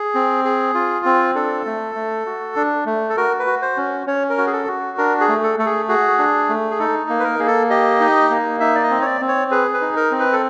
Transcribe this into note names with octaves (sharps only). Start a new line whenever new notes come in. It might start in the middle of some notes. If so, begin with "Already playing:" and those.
Already playing: G#4
C4
G#4
F4
C4
D4 A4
A3
A3
F#4
D4
A3
A4
F#4 A#4
B4
F#4
C5
C#4
C#4 C#5
A#4
F#4
G#4
A4
F#4
D4 A#4
G#4
A3
A4
A3 A4
G#4
F#4 G#4
D4
A3
G#4
D#4 A4
A#3
B4
A#4
A#3 G#4
A4
G4 D#5
D#4
A#3
D#4 E5
D5
D#5
C4
C#5
D5
C4
C#5
G#4 B4
B4
D#4
A#4
C4
B4
A4